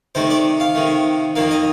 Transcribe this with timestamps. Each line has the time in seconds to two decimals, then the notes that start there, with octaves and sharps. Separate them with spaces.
0.15 C3 D#3 A3 C5
0.30 D5
0.60 F5
0.75 C3 D#3 A3
1.35 F2 D#3 A#3 F5
1.51 D#5